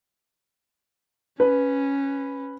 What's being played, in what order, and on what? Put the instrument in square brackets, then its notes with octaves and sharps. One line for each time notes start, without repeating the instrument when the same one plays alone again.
[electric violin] C#4 [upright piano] B4